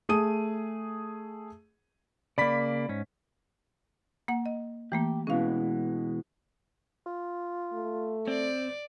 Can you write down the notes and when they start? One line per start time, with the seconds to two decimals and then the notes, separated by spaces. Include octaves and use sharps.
0.09 A3 G#4 D#6 D#7
2.38 C#3 A#3 D5 B5 B6
2.89 G#2 C#4
4.28 A#3 F#5
4.46 D#5
4.92 E3 A3 A#3 G4
5.27 B2 E3 G#3 C#4 F5
7.06 F4
7.73 A3
8.27 C4 D5